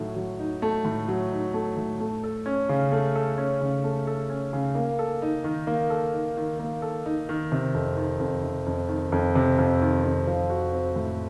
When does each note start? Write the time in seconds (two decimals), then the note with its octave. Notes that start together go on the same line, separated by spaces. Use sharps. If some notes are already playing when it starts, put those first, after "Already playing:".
Already playing: A2 F#3 A3 D#4
0.16 F#3
0.39 D#4
0.62 A3
0.85 A2
1.08 F#3
1.32 D#4
1.54 A3
1.77 A2
2.00 A3
2.24 A4
2.46 C#4
2.69 C#3
2.92 A3
3.15 A4
3.38 C#4
3.61 C#3
3.84 A3
4.07 A4
4.30 C#4
4.53 C#3
4.75 A#3
4.99 A4
5.22 D#4
5.44 D#3
5.67 A#3
5.90 A4
6.13 D#4
6.37 D#3
6.59 A#3
6.82 A4
7.06 D#4
7.29 D#3
7.52 C3
7.74 F2
7.97 D#3
8.20 F2
8.43 C3
8.66 F2
8.89 D#3
9.12 F2
9.35 C3
9.58 F2
9.82 D#3
10.04 F2
10.27 F3
10.50 F#4
10.73 C4
10.96 A2